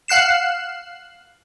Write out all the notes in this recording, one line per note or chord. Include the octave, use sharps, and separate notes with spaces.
F5 F#5 F#6 C7 E7